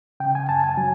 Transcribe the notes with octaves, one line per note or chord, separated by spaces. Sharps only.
C#3 G5
G#5
F#2 A5
G#5
F#3